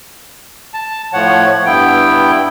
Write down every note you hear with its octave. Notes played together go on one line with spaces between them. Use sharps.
A5
A2 F3 C#5 F#5
G2 B3 E4 G5